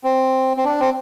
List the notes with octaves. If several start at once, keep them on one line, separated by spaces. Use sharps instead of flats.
C4
C4
D4
C4